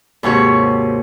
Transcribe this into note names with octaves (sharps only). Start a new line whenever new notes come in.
D#2 G#2 C3 F#4 C#5